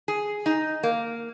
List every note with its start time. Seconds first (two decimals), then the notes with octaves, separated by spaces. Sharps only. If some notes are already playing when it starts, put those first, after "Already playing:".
0.08 G#4
0.46 D#4
0.83 A#3